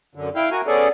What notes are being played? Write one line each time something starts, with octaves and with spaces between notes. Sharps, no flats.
F#2 D3
E4 F5 G5
F#4 A#4 G#5
B3 C#4 G#4 A4 D5